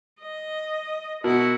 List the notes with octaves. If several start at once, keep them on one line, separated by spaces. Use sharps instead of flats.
D#5
B2 E4 F#4 A#4